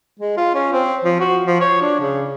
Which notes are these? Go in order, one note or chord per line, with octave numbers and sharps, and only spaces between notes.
G#3
F4
C#4
C4
F3
F#4
F3
C#5
D4
C#3